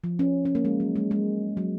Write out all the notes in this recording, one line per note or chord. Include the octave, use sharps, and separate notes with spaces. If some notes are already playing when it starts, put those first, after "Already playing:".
F3
C#4
C#4
A#3
G#3
F#3
G#3
G#3
F#3